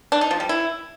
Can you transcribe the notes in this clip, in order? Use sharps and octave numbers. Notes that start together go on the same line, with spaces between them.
D4
D#4
F3
G3
E4